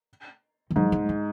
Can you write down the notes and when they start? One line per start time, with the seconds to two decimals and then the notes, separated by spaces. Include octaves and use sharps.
0.70 D#3
0.76 G#2 F#3
0.92 G#3
1.09 G#3